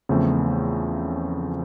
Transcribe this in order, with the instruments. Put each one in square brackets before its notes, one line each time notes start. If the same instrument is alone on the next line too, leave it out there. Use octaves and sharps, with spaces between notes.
[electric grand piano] E2 C#3 F3 A3 C4